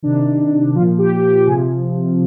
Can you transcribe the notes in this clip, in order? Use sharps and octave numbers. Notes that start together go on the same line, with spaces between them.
C3 D#3 D4
A#2 F3 F4
G4
G4
C3 F3 G#4